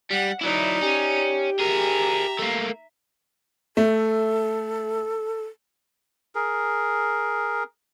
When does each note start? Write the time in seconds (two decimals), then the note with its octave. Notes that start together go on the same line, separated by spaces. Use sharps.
0.11 G3 F#5
0.41 F#3 D#4 E4 D5
0.82 C#4 G4
1.59 G#4 A#4 E5 A#5
2.39 A3 A#3
3.77 A3 A4
6.35 G#4 A#4